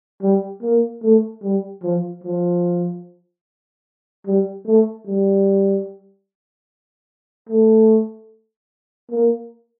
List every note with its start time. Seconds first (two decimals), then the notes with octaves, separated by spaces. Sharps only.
0.22 G3
0.62 A#3
1.03 A3
1.43 G3
1.84 F3
2.24 F3
4.26 G3
4.66 A3
5.07 G3
7.49 A3
9.11 A#3